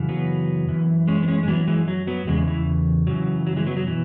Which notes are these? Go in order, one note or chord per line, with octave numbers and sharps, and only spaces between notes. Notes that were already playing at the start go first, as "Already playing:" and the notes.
Already playing: F#2 C#3 E3
F#3 B3
F#2 E3
G#3 C#4
B3
G#3 C#4
G#3
F#2 E3 F#3 B3
E3 G#3
F#3
F#3 B3
E2 C#3 G#3
E3
F#2 C#3 E3 F#3
F#3
E3 G#3
F#3 B3
F#3
B2 E3